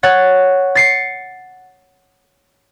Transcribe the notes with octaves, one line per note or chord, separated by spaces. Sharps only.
C#5 F#5 A6
A6 C7 C#7